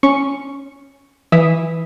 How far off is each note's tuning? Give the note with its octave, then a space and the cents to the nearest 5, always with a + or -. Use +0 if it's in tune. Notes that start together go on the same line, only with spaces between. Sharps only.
C#4 +0 C#6 +0
E3 +0 E5 +0 D#6 +0